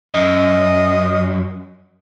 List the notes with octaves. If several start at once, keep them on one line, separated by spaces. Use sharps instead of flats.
F#2 D#5